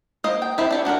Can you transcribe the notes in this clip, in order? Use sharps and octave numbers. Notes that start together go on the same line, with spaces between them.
A#3 C5 D#5
G5
C4 E4 G4
D4 G4 C#5
F#3 D4 F#4 A#4